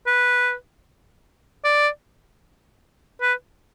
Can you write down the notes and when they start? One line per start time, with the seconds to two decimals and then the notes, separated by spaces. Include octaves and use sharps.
0.06 B4
1.64 D5
3.21 B4